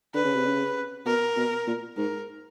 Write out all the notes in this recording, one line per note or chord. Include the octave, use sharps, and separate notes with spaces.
D3 B4
C#3
C3
C#3
B2 A#4
B2
A#2
G#2 A#4